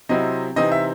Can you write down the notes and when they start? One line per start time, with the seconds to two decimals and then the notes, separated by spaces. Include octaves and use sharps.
0.09 C3 F#3 C4 E4 D#5
0.56 C3 E3 C4 D#4 D#5
0.72 E5